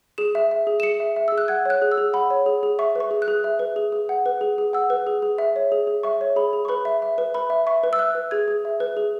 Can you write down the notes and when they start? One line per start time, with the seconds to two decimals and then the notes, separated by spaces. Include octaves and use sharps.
0.18 G#4 E7
0.35 E5
0.51 E5
0.67 G#4
0.80 E7
0.83 G#4 C#7
1.00 E5
1.16 E5
1.28 G#4 E6
1.38 F#6
1.48 F#5 G#6
1.65 C#5 F#6
1.82 G#4
1.92 E6
1.98 G#4
2.13 F#5 B5
2.30 C#5
2.46 G#4
2.63 G#4
2.79 E5 C#6
2.95 B4 C#6
3.11 G#4
3.22 F#6
3.28 G#4
3.44 E5
3.59 B4
3.76 G#4
3.92 G#4
4.09 F#5
4.26 B4
4.41 G#4
4.58 G#4
4.73 F#5 E6
4.90 B4
5.07 G#4
5.22 G#4
5.38 E5
5.56 C#5
5.72 G#4
5.87 G#4
6.03 E5 C#6
6.21 C#5
6.36 G#4 B5
6.53 G#4
6.65 C#6
6.69 B4 B5
6.85 E5
7.02 E5
7.18 B4
7.34 B4 B5
7.50 E5
7.67 E5 C#6
7.84 B4
7.93 E6
7.99 E5 F#6
8.15 B4
8.31 G#4 G#6
8.48 G#4
8.65 E5
8.80 B4
8.97 G#4